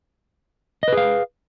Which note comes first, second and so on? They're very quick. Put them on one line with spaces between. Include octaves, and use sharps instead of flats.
D#5 B4 G#4 F5